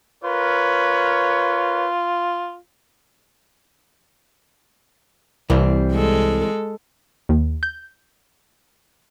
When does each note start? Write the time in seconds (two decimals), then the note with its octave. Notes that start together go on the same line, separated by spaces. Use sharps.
0.24 F4 A#4 B4 C#5
5.50 C2 E3 G3 C4
5.93 G#3 A4
7.29 D#2
7.63 G6